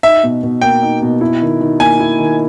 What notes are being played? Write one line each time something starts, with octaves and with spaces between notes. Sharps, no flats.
D#4 E5
B2
B2
A#3 G5
D#4
B2
E4
D#3
D#3
A#3 G#5
E4
D#3